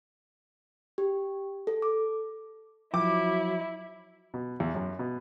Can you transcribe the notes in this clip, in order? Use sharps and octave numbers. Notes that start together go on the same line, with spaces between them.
G4
A4
D6
F3 F#3 E4 D6
B2
E2
F#2
B2